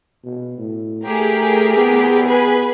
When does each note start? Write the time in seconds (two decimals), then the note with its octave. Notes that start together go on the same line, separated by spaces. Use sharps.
0.24 B2
0.58 A2
1.06 A3 G4 G#4 A#4
1.77 B3
2.27 G#4 B4 G#5